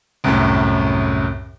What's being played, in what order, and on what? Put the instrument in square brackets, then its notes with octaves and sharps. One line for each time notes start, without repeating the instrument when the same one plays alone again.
[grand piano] C2 F#2 A2